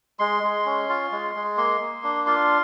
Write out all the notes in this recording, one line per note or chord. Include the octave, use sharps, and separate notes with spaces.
G#3 C6
G#3
C#4
F4
G#3
G#3
A#3 C6
A#3
D4
F4 C6